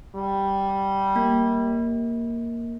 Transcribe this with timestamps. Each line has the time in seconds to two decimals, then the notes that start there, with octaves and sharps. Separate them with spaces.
0.15 G3
1.16 A#3